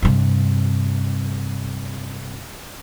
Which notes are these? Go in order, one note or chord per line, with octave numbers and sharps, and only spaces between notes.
G2 C3